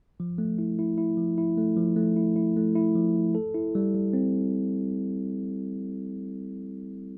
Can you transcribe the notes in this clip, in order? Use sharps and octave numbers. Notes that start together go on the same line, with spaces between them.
F3
A3
E4
E4
E4
F3
E4
A3
F3
A3
E4
E4
A3
E4
F3
A3
A4
E4
G3
G3
C4